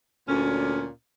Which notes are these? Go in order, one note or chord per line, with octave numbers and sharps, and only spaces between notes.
D2 A#2 C#4